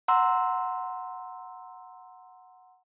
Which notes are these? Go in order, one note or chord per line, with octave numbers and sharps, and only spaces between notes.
F#5 A#5 C6 E6